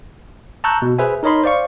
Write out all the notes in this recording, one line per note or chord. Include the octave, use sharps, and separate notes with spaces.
A5 A#5 C#6 E6 F#6 G6
B2
G#4 B4 C5 E5 G#5
D#4 A#4 C#5 D#5 B5 C6
C5 D5 F5 C#6